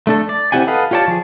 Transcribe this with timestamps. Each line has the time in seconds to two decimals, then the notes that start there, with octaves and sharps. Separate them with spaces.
0.07 A3 D4 A4
0.29 D5
0.52 C4 E4 G4 F#5 G#5
0.67 A4 B4 D#5 F5 F#5
0.91 F4 G4 C#5 D5 A5
1.08 F3 G#4